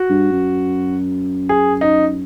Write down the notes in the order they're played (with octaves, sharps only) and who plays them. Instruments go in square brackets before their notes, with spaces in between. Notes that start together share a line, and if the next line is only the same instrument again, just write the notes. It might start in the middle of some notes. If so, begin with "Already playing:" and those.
Already playing: [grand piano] F#4
[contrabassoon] G2
F#2
[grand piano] G#4
D#4